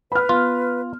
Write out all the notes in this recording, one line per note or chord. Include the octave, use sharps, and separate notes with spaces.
B4 B5 F6
B3 F4